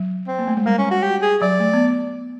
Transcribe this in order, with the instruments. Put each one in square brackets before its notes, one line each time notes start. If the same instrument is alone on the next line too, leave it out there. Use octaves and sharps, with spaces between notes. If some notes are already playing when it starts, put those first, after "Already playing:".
Already playing: [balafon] F#3
[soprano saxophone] C4
[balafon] A#3
A3
G#3
[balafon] G3 [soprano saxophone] A#3
[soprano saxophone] C#4
F#4
G4
G#4
[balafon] F#3 [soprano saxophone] D5
[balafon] A3
B3